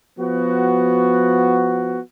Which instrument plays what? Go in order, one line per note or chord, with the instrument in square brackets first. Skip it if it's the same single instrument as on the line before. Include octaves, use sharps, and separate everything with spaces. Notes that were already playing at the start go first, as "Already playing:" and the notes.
[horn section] F3 B3 F#4